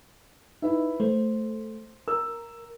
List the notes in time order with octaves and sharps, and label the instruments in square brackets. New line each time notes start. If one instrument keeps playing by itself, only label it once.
[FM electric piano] D#4 [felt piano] E4 B4 E5
[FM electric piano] A3 [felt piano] C5
[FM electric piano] A#4 [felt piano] E6